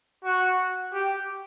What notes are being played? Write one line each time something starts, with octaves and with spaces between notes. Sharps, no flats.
F#4
G4